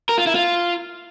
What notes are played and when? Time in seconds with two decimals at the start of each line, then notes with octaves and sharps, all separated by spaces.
0.09 A#4
0.18 F4
0.26 E4
0.35 F4